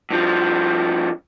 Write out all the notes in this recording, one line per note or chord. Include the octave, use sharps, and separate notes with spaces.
G2 F3